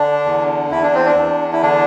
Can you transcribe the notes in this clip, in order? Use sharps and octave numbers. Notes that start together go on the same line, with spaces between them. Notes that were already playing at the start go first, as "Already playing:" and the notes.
Already playing: D3 D4
E2
E2 E4
D4
C4
D4
E2
E4
D3 D4